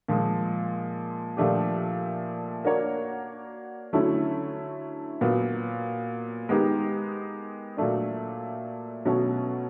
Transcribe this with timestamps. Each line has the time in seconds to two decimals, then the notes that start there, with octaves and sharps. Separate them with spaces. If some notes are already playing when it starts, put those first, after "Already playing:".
0.08 A#2 F3 G#3
1.37 A#2 F3 A3 D4 G4
2.65 A#3 D4 F#4 A#4 C#5
3.93 D3 F#3 A3 C#4 E4
5.21 A#2 F#3 B3
6.49 G#3 B3 D#4 G4 A#4
7.77 A#2 F#3 A3 D4
9.05 B2 F#3 A3 C#4 F#4